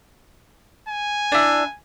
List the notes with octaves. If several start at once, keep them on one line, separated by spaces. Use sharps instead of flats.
G#5
D4 E4